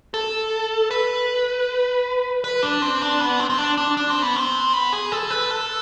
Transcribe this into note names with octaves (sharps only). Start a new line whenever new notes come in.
A4
B4
B4
D4
C4
D4
B3
C4
C4
D4
D4
D4
C4
B3
C4
B3
G#4
A4
B4
A4